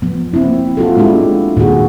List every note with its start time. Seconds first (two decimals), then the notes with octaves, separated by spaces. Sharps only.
0.02 F3 B3
0.33 A#3 C4 E4
0.77 F4 F#4 A4
0.97 G#3 B3 D4 E4 G4
1.57 A#2 D#3 F#4 G#4